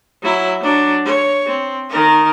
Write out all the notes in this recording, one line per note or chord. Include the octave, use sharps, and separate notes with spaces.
F#3 E4
F#3 D4
C#5
C4
D#3 A#4